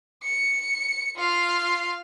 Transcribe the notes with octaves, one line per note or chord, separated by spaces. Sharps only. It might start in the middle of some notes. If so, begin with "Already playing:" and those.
C#7
F4 F5